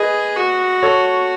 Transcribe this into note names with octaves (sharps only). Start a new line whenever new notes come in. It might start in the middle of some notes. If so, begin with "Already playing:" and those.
Already playing: G#4 B4 D#5
F#4
A4 C#5